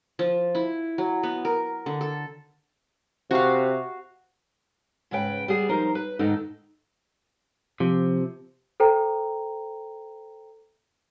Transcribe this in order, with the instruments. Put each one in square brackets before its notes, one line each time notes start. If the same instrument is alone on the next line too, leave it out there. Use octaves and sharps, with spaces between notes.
[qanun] F3
E4
F#3
B3
A#4
D3
A4
[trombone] C3 [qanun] F#4 F5
[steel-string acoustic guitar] G#2 C#3 B4 G5
G3 B3 G#4
F3 D#4 A#4 C5 A#5
B4
D2 G#2 D#3 D#4 A4
[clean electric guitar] C3 [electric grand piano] F3
[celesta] A4 C5 G5 A#5